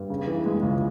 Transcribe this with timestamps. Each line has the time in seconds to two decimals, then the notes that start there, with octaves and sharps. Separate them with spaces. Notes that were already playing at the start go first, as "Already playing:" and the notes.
Already playing: G2
0.10 C#3
0.27 E3
0.46 G#3
0.63 C#2